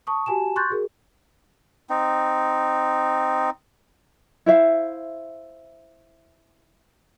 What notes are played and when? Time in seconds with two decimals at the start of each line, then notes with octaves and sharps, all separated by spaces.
0.07 A5 C#6 D#6
0.26 F#4 G4 G#5 A5 E7
0.56 C6 C#6 F#6 G6 A6
0.70 F#4 G#4 A#4
1.90 C4 D#4
4.46 E4 C5 E5 F5